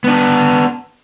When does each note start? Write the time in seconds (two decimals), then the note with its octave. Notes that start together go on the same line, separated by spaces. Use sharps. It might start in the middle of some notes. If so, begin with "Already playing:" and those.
0.04 B3 D4